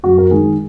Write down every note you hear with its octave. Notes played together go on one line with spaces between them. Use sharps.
F#2 F#4
A#4
D#3 G#3 D#4 G#4